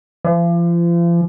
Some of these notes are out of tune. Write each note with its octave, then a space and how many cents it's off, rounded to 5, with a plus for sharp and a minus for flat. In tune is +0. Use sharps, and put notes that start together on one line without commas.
F3 -40